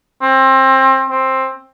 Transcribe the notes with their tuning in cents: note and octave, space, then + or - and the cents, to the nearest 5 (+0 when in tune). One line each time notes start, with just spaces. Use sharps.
C4 +25
C4 +15